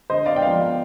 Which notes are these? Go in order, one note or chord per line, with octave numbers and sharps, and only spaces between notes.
D3 C5 D#5
D5 F5
G5
F3 B3 D5 F5